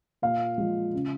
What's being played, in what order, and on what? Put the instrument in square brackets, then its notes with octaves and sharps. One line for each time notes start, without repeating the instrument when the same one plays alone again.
[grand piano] A#2 F5
F3 G#3
C#3